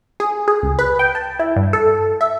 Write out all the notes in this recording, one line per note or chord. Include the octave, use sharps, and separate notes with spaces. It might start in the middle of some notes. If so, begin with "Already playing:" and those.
G#4
G#4
C#2
B4
G5
A5
E4
G2
A4
E5